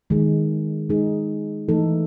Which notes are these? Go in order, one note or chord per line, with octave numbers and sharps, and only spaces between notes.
D#3 G#3 D#4 G#4
G#3 D#4 G#4
E3 A3 D#4 A4